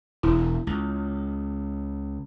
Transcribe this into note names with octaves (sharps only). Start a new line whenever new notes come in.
E1 E4
C#2